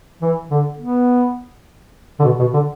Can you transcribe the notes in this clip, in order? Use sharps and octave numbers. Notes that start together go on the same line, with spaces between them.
E3
D3
B3
D3
B2
B2
D3